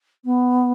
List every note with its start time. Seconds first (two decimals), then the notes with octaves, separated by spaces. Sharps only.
0.24 B3